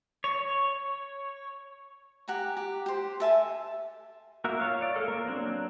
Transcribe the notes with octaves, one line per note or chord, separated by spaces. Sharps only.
C#5
G4 F#5 G#5 A#5
G4
G4 C5
A4 E5 G#5 A5
A#3 F#4 A#4 E5
F4 C#5 F5
C#5 D5
G#3 A4 A#4 F5 F6
A#3 A#4
F#3 A#3 C4 D4